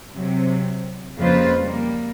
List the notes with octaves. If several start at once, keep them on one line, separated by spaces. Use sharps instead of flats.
C3 F#3
F2 C#3 A#3 F4 B4 C5
G3 A#3